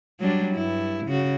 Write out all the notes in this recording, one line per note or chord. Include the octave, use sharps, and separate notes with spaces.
F#3 G3 D4
G2 E4
C#3 F#4